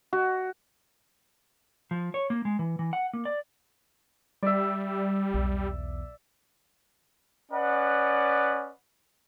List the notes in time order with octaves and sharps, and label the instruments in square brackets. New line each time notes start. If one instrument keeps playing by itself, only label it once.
[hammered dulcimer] F#4
[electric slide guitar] F3
C#5
A#3
G#3
E3
E3
F#5
A#3
D5
[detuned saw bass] G3 [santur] D5 E5
[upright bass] B1 E2
[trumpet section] C#4 B4 D5 D#5 F#5